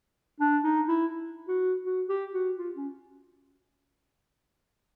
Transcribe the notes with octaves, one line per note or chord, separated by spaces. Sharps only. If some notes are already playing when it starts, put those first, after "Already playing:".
D4
D#4
E4
F#4
F#4
G4
F#4
F4
C#4